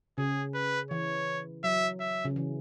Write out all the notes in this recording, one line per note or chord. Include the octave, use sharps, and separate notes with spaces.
C#3 G#4
B4
E3 C#5
F#3 E5
E5
C#3
E3